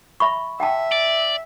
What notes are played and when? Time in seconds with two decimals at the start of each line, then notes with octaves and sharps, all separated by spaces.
0.20 E5 B5 C#6
0.60 E5 F#5 G5 A5
0.92 D5